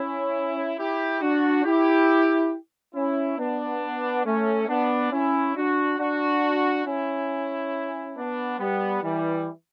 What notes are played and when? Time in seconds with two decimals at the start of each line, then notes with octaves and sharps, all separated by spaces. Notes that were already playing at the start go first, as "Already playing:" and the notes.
Already playing: C#4 E4
0.78 E4 G4
1.21 D4 F#4
1.64 E4 G4
2.95 C#4 E4
3.39 B3 D4
4.25 A3 C#4
4.68 B3 D4
5.12 C#4 E4
5.55 D4 F#4
5.99 D4 F#4
6.86 C#4 E4
8.16 B3 D4
8.59 G3 B3
9.02 E3 G3